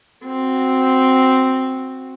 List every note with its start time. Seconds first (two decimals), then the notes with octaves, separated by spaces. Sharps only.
0.24 C4 F#4